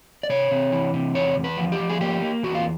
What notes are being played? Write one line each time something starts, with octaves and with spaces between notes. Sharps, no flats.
D5
C3 C#5
C3
E3
C3
E2 C#5
E2
B4
F3
G4
F3
G#4
A#3 G4
A#3
E2 F#4
F4